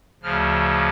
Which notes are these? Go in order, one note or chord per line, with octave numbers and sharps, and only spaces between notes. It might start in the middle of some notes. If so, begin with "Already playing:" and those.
D2 C#3 F3 F6